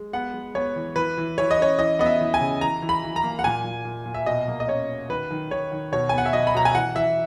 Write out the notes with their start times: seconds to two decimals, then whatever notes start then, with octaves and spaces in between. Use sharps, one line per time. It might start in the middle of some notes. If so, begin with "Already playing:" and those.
Already playing: G#3
0.13 B3 F#5
0.34 G#3
0.55 B3 C#5
0.76 E3
0.96 E3 B4
1.17 E3
1.38 E3 C#5
1.51 D#5
1.58 C#4 C#5
1.79 E3 D#5
1.99 B3 D#5
2.06 E5
2.21 E3
2.34 G#5
2.41 C#3
2.61 E3 A#5
2.82 E3
2.89 B5
3.04 E3
3.16 A#5
3.24 A#3
3.39 F#5
3.44 A#2 G#5
3.64 A#2
3.85 A#2
4.06 A#2
4.14 E5
4.26 B2 D#5
4.48 A#3
4.60 D#5
4.68 C#4 C#5
4.88 C#4
5.09 D#3 B4
5.30 D#3
5.51 D#3 C#5
5.72 D#3
5.92 B2 C#5
6.09 G#5
6.13 B3 F#5
6.26 E5
6.33 B2 D#5
6.47 B5
6.55 B2 A#5
6.65 G#5
6.74 E3 F#5
6.95 E3 E5